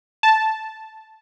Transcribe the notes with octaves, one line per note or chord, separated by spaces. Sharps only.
A5